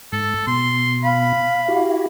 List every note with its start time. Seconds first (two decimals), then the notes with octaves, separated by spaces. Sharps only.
0.12 G#2 A4
0.47 B2 C6
1.04 F5 B5
1.68 E4 F#4 G4